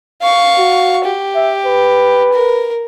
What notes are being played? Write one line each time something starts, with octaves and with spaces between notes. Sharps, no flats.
F5 C#6
F#4
G4
E5
B4
A#4